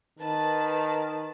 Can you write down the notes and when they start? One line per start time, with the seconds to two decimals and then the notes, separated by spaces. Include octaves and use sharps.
0.19 D#3 B4 A5